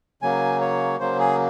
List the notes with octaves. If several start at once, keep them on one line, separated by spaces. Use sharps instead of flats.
C#3 F#3 A#3 G#5
C#5
C#3 F#3 A#3 C5
G#4